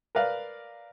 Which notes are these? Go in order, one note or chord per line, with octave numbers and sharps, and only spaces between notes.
A#4 B4 D5 F5